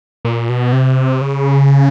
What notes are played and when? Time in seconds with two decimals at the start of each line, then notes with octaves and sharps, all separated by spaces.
0.25 A#2
0.49 B2
0.73 C3
1.21 C#3